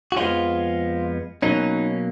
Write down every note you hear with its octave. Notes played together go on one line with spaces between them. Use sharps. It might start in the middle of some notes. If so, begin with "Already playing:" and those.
F#4
F2 F3 G#3 B3 C#4 F4
B2 F#3 A#3 C#4 D#4